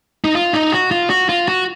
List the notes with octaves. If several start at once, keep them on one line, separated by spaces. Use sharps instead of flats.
D#4
F4
D#4
F#4
F4
F#4
F4
F#4